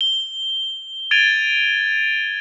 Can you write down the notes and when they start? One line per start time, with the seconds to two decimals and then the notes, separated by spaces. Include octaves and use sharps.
0.01 G7
1.11 G#6 A6 D7 D#7 F7 G7